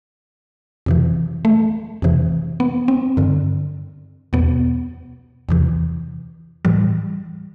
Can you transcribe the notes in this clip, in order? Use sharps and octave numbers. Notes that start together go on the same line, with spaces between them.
F2 C3 E3
A3
F2 C3 E3
B3
C4
G2 D3
E2 B2 B3
E2 C3 E3
A2 E3 G3